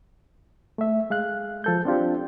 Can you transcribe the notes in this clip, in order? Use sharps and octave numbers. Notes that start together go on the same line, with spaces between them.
A3 E5
G#3 F5 F#6
F3 A4 G6
C4 D4 F4 G4